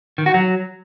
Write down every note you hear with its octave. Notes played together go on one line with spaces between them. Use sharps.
D#3
F#4
F#3